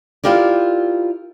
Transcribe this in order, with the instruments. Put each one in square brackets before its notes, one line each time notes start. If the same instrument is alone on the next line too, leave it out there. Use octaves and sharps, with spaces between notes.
[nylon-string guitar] E4 F4 G4 A#4 D5